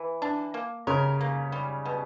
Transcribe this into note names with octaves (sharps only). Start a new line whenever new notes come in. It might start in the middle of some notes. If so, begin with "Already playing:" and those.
Already playing: E3
D4
A#3
C#3 C#4 A#4
A#3
G3
B2